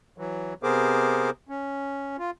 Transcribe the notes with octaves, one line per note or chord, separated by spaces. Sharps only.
E3 F#3
C3 B3 G#4 A#4 C5 D6
C#4
F4